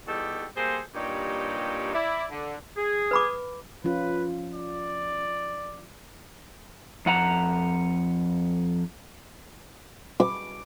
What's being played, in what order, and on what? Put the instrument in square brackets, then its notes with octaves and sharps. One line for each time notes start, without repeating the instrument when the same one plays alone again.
[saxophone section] E2 G3 D#4 F#4 G4 A4
G3 A#3 G#4 A4 C5
G2 A#2 G3 D#4 G4 C#5
E4 D5
D3
[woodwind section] G#4
[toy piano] B4 B5 D6
[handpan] F3 C#4 F4 [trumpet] B4
[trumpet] D5
[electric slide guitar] F2 F#5 A#5
[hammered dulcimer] D6